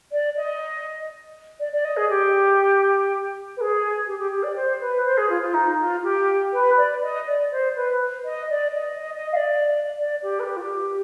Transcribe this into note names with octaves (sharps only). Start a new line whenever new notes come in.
D5
D#5
D5
D5
D#5
G#4
G4
B4
G#4
G4
G4
G4
D5
C5
B4
C5
G#4
F4
F4
D#4
F4
G4
B4
D5
D#5
D5
C5
B4
D#5
D5
D#5
D#5
D#5
F5
D5
D5
G4
B4
G4
F4
G4